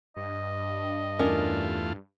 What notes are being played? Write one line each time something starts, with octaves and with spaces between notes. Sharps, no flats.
G2 D#5
E2 A3 C#4 D4 F4 A#4